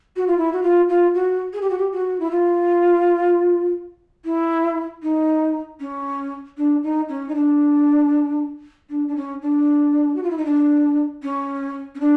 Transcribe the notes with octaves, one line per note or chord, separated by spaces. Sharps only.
F#4
F4
E4
F#4
F4
F4
F#4
G#4
G4
F#4
G4
F#4
E4
F4
E4
D#4
C#4
D4
D#4
C#4
D#4
D4
D4
D4
C#4
D4
F#4
F4
E4
D#4
D4
C#4
C#4
D4